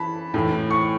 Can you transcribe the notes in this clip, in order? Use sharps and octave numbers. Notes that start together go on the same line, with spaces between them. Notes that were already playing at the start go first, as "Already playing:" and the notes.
Already playing: E3 A5 B5
A2 E3
C#6